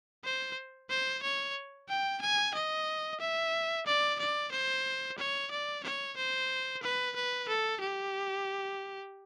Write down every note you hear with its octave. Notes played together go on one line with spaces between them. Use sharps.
C5
C5
C#5
G5
G#5
D#5
E5
D5
D5
C5
C#5
D5
C#5
C5
B4
B4
A4
G4